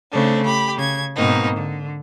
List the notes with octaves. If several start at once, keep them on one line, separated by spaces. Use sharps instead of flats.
C#3 A3 C4 D4
G4 B5
C#3 G#6
G#2 B2 A#3 C4 D#4
D3